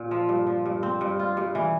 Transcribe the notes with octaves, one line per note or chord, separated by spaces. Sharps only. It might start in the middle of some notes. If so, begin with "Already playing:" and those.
Already playing: A#2
F3
G2
F3
G2
C4
G2
F4
G2
E3